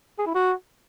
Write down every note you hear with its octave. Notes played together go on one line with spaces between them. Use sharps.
G#4
E4
F#4